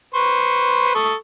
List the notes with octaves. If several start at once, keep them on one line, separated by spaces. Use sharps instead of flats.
B4 C5 C#6
A4 C#6 D#6